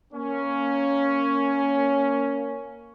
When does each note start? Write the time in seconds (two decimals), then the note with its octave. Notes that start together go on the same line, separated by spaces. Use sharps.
0.13 A#3 C#4